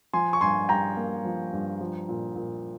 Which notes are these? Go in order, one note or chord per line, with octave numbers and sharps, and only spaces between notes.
F3 G#5 C6
C#6
G2 G#5 C6
G2 G5 A#5
A#3
F3
G2
F3
A#2
A#2